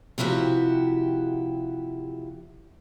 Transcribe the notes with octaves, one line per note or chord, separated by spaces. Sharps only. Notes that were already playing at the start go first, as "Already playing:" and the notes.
C3 F3 E4 F#4 G4